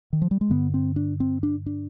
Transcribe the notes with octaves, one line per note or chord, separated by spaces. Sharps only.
D#3
F3
G3
G#3
G2 D3 B3
C4
D4
C4
D4
D4